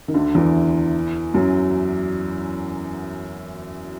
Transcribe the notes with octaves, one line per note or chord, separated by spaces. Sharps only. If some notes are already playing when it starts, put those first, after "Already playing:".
D#3
D2 D3
E2 E3
F#2 F#3